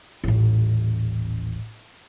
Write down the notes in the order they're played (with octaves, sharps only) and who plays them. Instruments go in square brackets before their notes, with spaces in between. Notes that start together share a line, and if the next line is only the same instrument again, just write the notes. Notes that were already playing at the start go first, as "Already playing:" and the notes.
[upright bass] D#1 A1